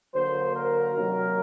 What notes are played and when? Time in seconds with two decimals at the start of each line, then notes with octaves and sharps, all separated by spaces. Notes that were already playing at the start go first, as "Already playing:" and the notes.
0.14 D3 F#3 A#3 C5
0.55 A#4
0.94 C3 D#3 F#3 A#3